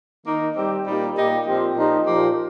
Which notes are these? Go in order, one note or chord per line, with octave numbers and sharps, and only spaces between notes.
D#3 A#3 D#4
G3 C4 G4
A#2 G3 A#3 D#4
A#2 A#3 D#4 G4
A#2 F3 C4 G4
A#2 F3 D#4 G4
A#2 F3 A#3 G4